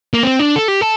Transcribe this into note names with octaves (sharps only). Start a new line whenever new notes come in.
A#3
C4
D4
A4
G4
A4